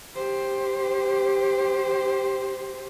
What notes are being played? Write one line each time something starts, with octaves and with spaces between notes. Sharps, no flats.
G4 C5